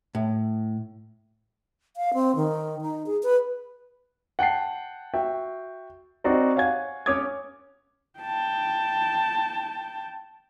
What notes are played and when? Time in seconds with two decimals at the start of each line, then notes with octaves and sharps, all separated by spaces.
0.15 A2
1.97 F5
2.14 C4
2.36 D#3
2.81 D#4
3.06 G#4
3.23 B4
4.39 F#5 G5 A5 C7
5.14 F#4 E5 G5
6.24 C4 D#4 F#4 C5 D5
6.56 C#5 F5 F#5 G#5 G#6
7.06 C#4 C#5 D6 D#6 G#6
8.19 G5 A5